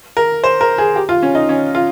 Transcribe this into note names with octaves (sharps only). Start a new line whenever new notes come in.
A#4
C5
A#4
G#4
G4
F4
C#4
D#4
C#4
F4